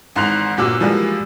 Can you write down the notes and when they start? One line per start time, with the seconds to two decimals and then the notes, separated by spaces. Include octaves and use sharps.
0.16 G#1 G#2 E3 C6 F#6 F7
0.57 G1 A#2 F#4 D6 E6
0.80 E3 F3 G3 G#3 A#3 F#4